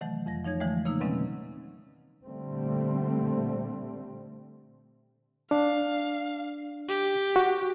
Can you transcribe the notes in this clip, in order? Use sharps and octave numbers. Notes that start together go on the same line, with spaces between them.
C3 D#3 E3 F#3 A3
F2 F3 A#6
F3 D#4 C#5 G#6
D3 E3 F3 G#3 A3
C#3 A#3 D#4 E6
B2 D#3 F#3 G#3 C4 C#4
A#2 D3 G3 A3 C4
D4 F5
G4
F#4